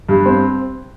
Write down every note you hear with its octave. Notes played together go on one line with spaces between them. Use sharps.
G2
C4